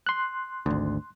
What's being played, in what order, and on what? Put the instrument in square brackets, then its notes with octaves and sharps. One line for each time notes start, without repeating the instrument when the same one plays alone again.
[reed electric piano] C6 F#6
[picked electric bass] G#1 D2